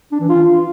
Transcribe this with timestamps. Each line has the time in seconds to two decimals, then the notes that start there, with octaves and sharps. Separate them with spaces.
0.12 D4
0.21 E3
0.29 F4